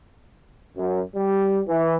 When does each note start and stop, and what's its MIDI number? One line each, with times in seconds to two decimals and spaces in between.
0.77 1.01 42
1.15 1.61 55
1.68 1.97 52